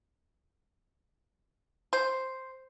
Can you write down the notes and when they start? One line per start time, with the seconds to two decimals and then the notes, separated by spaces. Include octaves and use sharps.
1.93 C5